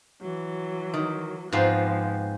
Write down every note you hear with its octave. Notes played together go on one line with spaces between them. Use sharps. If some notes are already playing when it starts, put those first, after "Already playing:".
E3 F#3
D#3
G#2 F3 B3 C4 F4